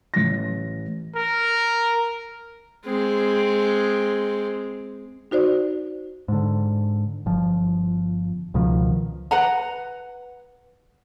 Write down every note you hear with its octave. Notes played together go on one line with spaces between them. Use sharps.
A1 A#6
A#4
G#3 C4
D#4 F#4 C5 D5
G#2 D3
G1 F3
C#2 B2 D#3 F3
B4 F#5 A#5